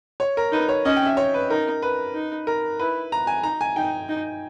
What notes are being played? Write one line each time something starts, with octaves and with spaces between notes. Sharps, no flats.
C#5
A#4
D#4 B4
C#5
C#4 D#5
G5
E5
C#5
B4
D#4 A#4
B4
D#4
A#4
E4 B4
A#5
G#5
D#4 A#5
G#5
D#4 G5
D#4